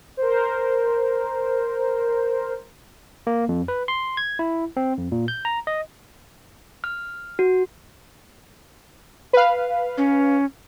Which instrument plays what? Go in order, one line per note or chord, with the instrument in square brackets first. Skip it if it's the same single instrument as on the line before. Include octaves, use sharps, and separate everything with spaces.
[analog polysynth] A#4 C5
[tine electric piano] A#3
F2
B4
C6
G#6
E4
C4
F2
A#2
G6
A#5
D#5
[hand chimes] F6
F#4
[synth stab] B4 F5
[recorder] C#4